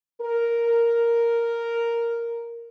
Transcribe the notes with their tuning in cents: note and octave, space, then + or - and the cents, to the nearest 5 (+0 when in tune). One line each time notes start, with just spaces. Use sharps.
A#4 +0